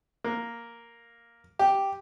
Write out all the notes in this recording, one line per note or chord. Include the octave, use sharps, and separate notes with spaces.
A#3
G4